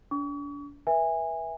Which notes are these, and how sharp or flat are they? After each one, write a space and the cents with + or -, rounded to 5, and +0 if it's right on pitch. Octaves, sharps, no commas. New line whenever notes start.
D4 -35 C#6 +40
B4 -30 E5 +0 G#5 -20